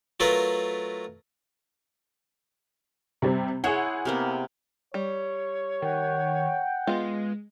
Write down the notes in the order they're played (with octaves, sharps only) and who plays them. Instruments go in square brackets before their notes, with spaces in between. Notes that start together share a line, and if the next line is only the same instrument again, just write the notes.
[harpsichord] F#3 A3 F4 A#4 B4
[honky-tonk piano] C3 G3 C4
[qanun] E4 C5 C#5 [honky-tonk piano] G#4 F#5
[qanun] C3 A#3 B3
[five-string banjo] G3 [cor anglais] C#5
[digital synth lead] D#3 [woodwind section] F#5 G5
[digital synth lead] G#3 [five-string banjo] B3 F4